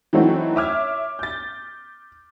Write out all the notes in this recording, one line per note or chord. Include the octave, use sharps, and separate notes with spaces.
E3 F#3 A3 C4 D#4 F#4
C#5 E5 D6 F6 G#6
G6 A6